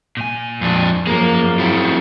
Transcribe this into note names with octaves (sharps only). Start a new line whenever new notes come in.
A#2 G#5
F2 D4
F#2 F3 A#3 G#4 A#5
C4 E4 F#4